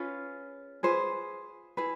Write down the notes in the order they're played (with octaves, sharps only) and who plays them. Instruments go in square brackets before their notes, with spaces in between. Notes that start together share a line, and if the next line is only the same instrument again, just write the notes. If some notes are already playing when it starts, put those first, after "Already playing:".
Already playing: [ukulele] C#4 F4 G#4 B4
F4 G#4 B4 C5
E4 G#4 B4